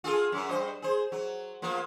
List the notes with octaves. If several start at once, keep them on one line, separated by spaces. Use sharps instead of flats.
F4 G#4 A4
F#2 F#3
G2 C5 D#5
G#4 C5
F#3
F3 A#3 B3